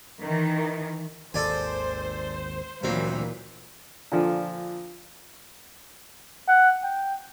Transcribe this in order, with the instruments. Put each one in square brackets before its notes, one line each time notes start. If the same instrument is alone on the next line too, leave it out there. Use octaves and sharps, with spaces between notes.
[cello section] D#3 E3
[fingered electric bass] G#1 D#2 [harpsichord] A4 D5 G#5 [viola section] C5
[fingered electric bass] D2 F#3 [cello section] A#2 E3 [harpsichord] C4
[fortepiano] A#2 D3 F3
[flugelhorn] F#5
G5